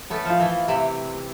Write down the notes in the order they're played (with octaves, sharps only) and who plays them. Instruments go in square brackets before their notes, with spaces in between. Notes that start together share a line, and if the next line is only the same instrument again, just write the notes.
[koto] A3 B3 [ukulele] C#4
[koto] F3 [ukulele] F4
[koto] E3
[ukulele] F4
[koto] C3 [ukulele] E5